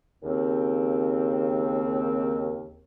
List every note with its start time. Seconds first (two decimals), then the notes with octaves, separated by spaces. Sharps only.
0.23 D#2 C#3 C4